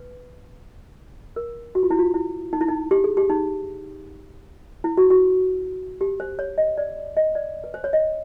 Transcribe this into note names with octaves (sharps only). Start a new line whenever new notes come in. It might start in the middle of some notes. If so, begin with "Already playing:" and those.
Already playing: B4
A#4
F#4
F4
E4
F4
E4
D#4
E4
D#4
G4
G#4
G4
D#4
E4
F#4
F#4
G4
C5
C#5
D#5
D5
D#5
D5
B4
C5
C#5
D#5